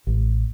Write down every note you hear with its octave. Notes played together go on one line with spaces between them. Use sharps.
A1